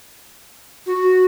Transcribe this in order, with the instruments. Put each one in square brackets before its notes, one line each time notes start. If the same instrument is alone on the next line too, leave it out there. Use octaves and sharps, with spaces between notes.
[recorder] F#4